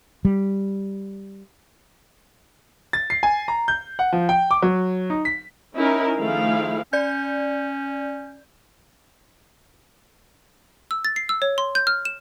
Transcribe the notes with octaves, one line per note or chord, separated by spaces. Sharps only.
G3
A6
C7
G#5
A#5
G6
F#5
F3
G5
D6
F#3
D#4
B6
C#4 D#4 E4 A#4
D#3 F3 A3 E4 G#4 F5
C#4 D5 G6
E6
A6
C7
E6
C#5
C6
G6
F6
E7